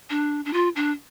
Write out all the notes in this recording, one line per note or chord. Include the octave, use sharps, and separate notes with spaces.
D4
D4
F4
D4